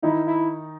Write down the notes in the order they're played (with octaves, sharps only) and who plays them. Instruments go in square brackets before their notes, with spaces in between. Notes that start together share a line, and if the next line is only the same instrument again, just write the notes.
[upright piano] D#3 D#4 [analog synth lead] E4
[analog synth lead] E4